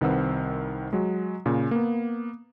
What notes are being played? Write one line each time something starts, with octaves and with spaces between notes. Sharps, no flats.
C2 D#3 C4 B4 F#5 E6
F#3 G#3
A#2 C#3
A#3 B3